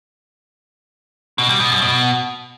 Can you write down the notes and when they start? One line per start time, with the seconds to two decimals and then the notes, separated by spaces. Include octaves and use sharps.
1.38 B2
1.49 G3
1.60 B2
1.71 F#2
1.82 B2